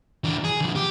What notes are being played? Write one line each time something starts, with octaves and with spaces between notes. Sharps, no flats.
E3 D4
G#4
D3 F3
G4